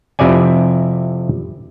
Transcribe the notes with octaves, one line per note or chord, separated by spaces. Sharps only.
F2 C3 E4 D5 G#5